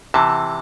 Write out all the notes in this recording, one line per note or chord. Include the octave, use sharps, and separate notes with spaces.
C3 E3 A5